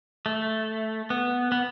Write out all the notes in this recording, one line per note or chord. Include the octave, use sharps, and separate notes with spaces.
A3
B3
B3